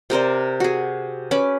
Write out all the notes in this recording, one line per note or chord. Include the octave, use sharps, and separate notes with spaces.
C3 A#4 C5 D5
F#4 G#4
C#4 B4 D6